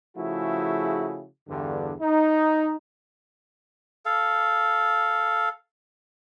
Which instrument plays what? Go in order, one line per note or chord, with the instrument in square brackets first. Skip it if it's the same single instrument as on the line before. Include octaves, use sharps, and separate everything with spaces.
[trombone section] C#3 F3 A3 E4 F#4 G#4
E2 G2 D3
D#4
[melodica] A4 F5